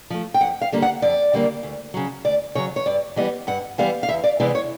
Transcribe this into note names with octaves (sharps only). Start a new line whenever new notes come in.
F3 A3
G5
F2 F#5
F5
D3 G3 A#3
F#5
F2 D5
D3 G3 A#3
D2
C#3 F#3
D2 D5
C#3 F#3 C#5
C#5
G2 D5
E3 G3 B3 D#5
G2 F#5
E3 G3 B3 F5
F5
E2 E5
D5
C3 E3 G#3 B3 D5
C#5